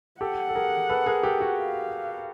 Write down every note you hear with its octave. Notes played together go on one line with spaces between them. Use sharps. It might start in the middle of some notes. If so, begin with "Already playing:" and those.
G4 A4 F#5
A4
G#4 A#4
A4 B4
G#4 A#4
G4 A4
F#4 G#4
F5